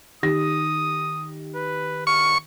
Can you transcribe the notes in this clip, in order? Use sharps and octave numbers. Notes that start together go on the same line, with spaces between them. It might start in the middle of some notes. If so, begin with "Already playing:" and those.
D#3 G4 D#6 A#6
B4
C#6 F6